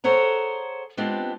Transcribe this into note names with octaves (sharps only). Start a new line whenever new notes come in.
G#4 A4 C5 C#5 F#5 A#5
G#3 B3 C4 D4 F4 G4